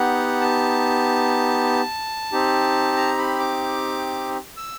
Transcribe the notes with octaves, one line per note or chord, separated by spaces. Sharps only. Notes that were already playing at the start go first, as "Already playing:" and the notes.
Already playing: B3 D#4 G4 F#5
A5
C4 D#4 G4
A#5
B5
D6
E6